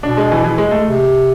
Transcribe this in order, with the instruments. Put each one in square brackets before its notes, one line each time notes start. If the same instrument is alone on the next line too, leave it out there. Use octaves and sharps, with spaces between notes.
[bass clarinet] B2 [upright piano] D4
[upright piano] G#3
E3
E3
G#3
A3
[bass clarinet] C3